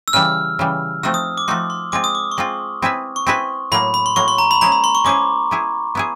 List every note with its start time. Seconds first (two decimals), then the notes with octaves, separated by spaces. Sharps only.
0.08 E6
0.13 C#3 E3 G3 F6
0.59 C#3 E3 G3
1.03 F3 A3 C4 D#4 F#4 E6
1.14 D#6
1.38 D6
1.48 F3 A3 C4 D#4 F#4 C6
1.70 C6
1.92 G#3 C4 F4 D6
2.04 D#6
2.15 D6
2.32 C#6
2.37 G#3 C4 F4 C6
2.82 C4 E4 G#4 B4 E5
3.16 C#6
3.27 C4 E4 G#4 B4 E5 C6
3.72 A2 F#3 A#3 B5
3.94 B5
4.06 C6
4.16 A2 F#3 A#3 C#6
4.28 C6
4.38 A#5
4.51 B5
4.61 G#3 C#4 E4 G#4 C5 A#5
4.72 B5
4.84 C6
4.95 C#6
5.04 G#3 C#4 E4 G#4 C5 D6
5.51 B3 E4 G#4
5.95 B3 E4 G#4